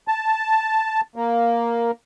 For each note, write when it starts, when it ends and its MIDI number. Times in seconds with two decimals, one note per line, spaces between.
0.08 1.01 81
1.16 1.91 58